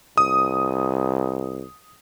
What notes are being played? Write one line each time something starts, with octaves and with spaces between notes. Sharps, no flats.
C2 D#6